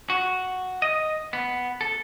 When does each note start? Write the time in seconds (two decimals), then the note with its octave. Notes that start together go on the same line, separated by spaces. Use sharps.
0.10 F#4
0.82 D#5
1.33 B3
1.81 A4